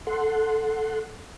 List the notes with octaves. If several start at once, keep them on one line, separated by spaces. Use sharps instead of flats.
A4 F#5 C6